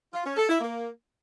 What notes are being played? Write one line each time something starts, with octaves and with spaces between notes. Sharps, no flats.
F4
C#4
A4
E4
A#3